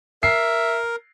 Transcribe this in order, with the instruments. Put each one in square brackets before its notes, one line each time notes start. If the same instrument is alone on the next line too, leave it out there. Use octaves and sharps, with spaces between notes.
[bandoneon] A#4 [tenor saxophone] E5 [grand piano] C7